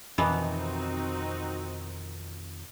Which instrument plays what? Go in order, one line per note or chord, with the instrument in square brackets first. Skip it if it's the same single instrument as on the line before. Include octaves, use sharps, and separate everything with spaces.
[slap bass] F2 D#3 [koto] B2 E3 B3 [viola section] C4 D#4 F#4